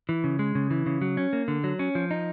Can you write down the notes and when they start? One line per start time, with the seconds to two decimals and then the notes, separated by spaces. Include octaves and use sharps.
0.09 E3
0.24 C#3
0.39 G#3
0.55 C#3
0.71 E3
0.86 C#3
1.01 F#3
1.17 C#4
1.33 A#3
1.48 D3
1.64 F#3
1.79 C#4
1.95 F3
2.11 D#4